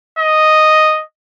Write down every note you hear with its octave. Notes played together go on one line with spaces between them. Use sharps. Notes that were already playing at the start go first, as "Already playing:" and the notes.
D#5